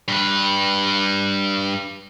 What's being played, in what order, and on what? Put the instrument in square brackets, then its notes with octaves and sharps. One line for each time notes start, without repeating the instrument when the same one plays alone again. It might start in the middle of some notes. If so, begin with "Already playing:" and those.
[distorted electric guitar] G2 B4